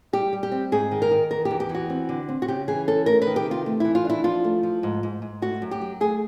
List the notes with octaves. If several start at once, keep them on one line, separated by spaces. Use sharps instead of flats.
G3 G4
G3
G4
C4
G#2 G#4
D#3
A#4
D#3
E2 A#4
G4
E2
G4
E3
F#4
C4
D3
C4
F#4
C#3 G4
E3 G#4
C#4 A4
A3 A#4
D#3 B4
G4
C3
F4
A3
E3 E4
F4
D4 E4
F3 F4
A3
F3
G#2
G#2
G#2
A3 F#4
F#2
G4
F#3
A3 G#4